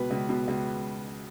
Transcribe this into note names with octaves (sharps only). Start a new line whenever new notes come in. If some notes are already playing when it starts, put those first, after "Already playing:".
Already playing: C#2 B2 B4
C#2
B2
C#2